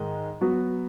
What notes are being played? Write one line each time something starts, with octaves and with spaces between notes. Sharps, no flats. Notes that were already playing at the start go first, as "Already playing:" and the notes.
Already playing: G#2 D#3 G#3 D#4
F#3 B3 F#4